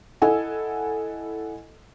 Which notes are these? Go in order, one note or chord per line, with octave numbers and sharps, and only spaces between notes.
E4 A4 D#5 F#5 G#5